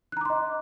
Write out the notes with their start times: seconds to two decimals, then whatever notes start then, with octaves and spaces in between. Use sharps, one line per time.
0.12 F#6
0.17 A#5
0.21 D6
0.25 C6
0.30 D#5